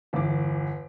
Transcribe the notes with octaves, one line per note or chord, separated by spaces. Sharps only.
G1 E2 E3 D6